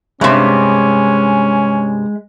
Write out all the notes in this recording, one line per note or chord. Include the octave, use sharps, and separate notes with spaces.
G2 C3 G#3 C#4 B5